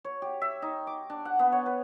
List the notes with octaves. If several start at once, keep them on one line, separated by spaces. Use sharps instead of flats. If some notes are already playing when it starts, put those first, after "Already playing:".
C#5
G4
E5
D#4
D6
D4
F#5
B3
C#5
B4